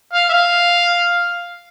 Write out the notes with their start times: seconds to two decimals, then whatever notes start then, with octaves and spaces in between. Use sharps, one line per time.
0.13 F5
0.29 E5
0.33 F5